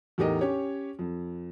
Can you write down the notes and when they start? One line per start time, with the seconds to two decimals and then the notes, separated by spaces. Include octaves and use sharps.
0.18 E2 A2 D#4 G4 A#4 D#5
0.41 C#4 G4 C#5
0.99 F2